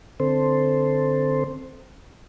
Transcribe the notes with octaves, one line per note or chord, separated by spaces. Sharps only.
D3 C4 A4 C5